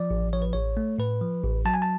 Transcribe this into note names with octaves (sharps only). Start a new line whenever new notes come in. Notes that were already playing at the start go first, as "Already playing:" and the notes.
Already playing: F3 D5
A1
F3 C#5
B4
A1 C#5
A3
A2 B4
F3
A1
F#3 A5
G#5
A5